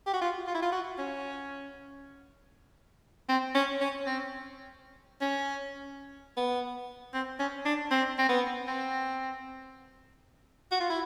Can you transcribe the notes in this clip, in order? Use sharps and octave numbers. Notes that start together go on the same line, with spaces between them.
G4
F#4
F4
F4
E4
F4
F#4
C#4
C4
C#4
C#4
C4
C#4
B3
C4
C#4
D4
C4
C4
B3
C4
F#4
F4
E4